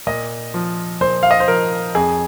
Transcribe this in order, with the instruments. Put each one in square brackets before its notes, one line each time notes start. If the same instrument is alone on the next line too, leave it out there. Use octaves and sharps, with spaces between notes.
[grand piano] A#2 D#5
F3
A#2 C5
F5
D#5
C5
F3 A#4
F2 G#4